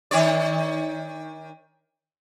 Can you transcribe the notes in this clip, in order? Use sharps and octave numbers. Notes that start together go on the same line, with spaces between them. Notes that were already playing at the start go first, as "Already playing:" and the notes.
D#3 C#5 D5